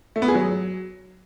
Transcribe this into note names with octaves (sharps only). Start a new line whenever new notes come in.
A3
B3
G#4
F#3